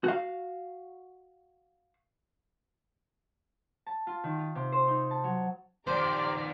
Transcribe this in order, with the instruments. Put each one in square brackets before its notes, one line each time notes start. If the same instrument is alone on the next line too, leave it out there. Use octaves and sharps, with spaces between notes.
[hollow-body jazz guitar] F#4 F5
[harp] A5
F4
D#3
F4
C3
C5
D#4
A5
F#3
[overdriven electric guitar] D#3 F3 [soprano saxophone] G4 [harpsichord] C5 [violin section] D5 A#5